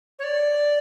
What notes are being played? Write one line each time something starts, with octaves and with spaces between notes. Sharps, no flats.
C#5
D5